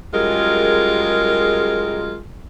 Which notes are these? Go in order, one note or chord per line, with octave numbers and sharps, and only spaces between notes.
F#2 G3 G#3 F4 G#4 A#4